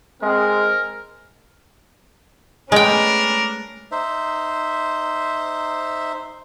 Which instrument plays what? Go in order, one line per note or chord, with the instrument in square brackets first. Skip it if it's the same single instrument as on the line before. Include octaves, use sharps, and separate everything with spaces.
[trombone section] G#3 C4 [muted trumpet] A#4
[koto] G#3 G5 [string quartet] A3 B3 C#4 [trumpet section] D4 A#4
[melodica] D#4 C5 E5